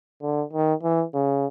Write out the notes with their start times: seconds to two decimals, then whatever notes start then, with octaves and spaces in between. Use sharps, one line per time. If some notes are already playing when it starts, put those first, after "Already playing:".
0.22 D3
0.53 D#3
0.83 E3
1.14 C#3